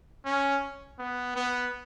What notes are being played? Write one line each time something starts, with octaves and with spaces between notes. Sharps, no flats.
C#4
B3
B3